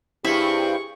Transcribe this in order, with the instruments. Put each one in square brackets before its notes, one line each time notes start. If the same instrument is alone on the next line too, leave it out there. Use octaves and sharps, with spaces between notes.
[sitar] G2 C4 [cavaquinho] E4 [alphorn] G4 [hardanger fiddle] G#4 C#6